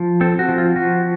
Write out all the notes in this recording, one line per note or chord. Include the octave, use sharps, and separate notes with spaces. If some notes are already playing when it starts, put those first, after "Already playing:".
Already playing: F3
C4 A4
F#4
F3
F4
F3 F#4